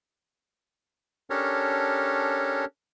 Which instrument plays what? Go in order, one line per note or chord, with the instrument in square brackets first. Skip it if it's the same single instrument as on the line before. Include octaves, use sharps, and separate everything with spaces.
[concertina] C#4 D4 G4 A4 A#4 C#5